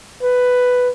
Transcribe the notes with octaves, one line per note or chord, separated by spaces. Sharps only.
B4